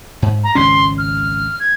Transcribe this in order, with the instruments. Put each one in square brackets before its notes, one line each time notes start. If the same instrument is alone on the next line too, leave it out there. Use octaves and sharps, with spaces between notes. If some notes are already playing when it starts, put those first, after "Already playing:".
[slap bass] G#2
[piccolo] A#5
[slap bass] G#1 C#2 C#4 [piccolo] C6
[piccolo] F6
G#6